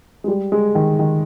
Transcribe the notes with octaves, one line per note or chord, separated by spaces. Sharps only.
G#3
G3
G#3
D#3
D#3